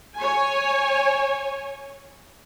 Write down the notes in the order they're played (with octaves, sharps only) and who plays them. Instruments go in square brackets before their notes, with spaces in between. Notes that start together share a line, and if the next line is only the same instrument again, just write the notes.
[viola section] C#5 G#5